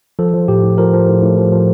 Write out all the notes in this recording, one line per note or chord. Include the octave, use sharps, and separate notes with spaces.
F3 A4
F3
A2 G4
A2
F3 A#4
F3
A2
A2
F3
F3